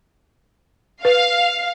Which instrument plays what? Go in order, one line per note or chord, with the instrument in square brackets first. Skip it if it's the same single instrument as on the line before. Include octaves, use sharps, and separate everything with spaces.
[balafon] B4 [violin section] F5